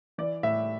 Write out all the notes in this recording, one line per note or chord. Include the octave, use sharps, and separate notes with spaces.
E3 D5
A2 E5